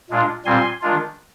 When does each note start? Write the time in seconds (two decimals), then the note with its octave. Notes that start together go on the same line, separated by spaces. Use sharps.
0.10 A#2 G#3 D4 F4
0.45 A#2 G3 C4 G#5 C6
0.81 D#3 G#3 D4 F4